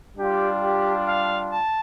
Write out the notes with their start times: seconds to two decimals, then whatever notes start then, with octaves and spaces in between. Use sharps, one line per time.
0.16 G3 D4 F4 G4
0.61 G4
1.06 F5
1.51 A5